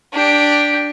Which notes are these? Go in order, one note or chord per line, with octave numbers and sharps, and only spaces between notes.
D4 G4